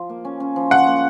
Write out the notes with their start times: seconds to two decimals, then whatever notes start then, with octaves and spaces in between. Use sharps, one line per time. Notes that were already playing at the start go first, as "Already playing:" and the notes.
Already playing: F3
0.09 A#3
0.25 C#4
0.40 C#4
0.56 F3
0.71 F3 F#5
0.87 A#3